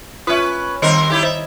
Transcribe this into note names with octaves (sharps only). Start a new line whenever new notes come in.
C#4 F4 B4 E5
D#2 D#3 G3 C4 A#4 D#5
D#4 E4 G4
C5 E5